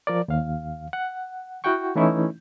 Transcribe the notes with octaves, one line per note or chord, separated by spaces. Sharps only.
F3 A#4 D5
D#2 F5
F#5
E4 F#4 F#5 G5 C#6
E3 A3 C#4 D#4 E4